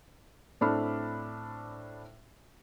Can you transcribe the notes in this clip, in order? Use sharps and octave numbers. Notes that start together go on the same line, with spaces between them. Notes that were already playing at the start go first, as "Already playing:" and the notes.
A2 C4 D4 A4 B5 F6